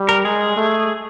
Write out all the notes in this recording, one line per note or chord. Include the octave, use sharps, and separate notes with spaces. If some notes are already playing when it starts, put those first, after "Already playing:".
Already playing: G3
A#4
G#3 G#4
A3